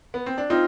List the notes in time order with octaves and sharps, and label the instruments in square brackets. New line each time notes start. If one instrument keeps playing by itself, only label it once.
[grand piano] B3
C4
D4
[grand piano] C4 D#4 [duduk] F4